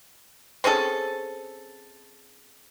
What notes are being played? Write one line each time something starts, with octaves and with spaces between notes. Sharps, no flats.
C4 C#4 G#4 A4